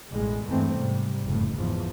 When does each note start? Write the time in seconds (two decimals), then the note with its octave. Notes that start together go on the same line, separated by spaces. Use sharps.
0.10 A1 E2 B2 G3 G#3
0.47 E2 G2 E3 G#3 A3 C4
0.76 G#2 C3 G3
1.25 F#1 F2 A2
1.55 E2 G#2 F3